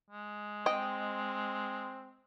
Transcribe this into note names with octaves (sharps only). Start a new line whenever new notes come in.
G#3
C4 D#5 G5